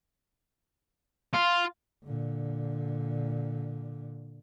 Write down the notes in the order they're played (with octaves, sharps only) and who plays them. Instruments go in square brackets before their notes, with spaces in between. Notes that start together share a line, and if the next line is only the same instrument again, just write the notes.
[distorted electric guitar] F4
[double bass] A#2 D3